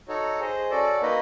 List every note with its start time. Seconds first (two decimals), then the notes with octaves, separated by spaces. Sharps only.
0.08 D#4 F#4 A4 C#5
0.40 G#4 C5 D#5
0.70 C#4 F#4 A4 D5
1.01 A#3 D#4 F#4 B4 D#5